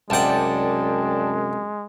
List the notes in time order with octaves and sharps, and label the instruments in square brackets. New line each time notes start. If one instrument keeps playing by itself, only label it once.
[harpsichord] C2 F#5 [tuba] F#2 [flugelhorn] G#3 [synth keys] D5 G5 A5